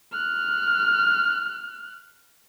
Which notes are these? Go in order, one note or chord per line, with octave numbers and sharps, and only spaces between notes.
F6 F#6